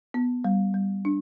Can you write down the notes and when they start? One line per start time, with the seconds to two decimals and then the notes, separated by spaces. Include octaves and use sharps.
0.14 B3
0.44 G3
0.74 G3
1.05 D4